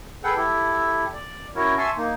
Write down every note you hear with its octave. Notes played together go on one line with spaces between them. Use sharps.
G#4 A4 B4 F#5 G5
E4 G4 A4
D5
C#4 E4 F#4 A#4 C#5
E5 G#5 A5 C6 C#6 E6
A#3 D#4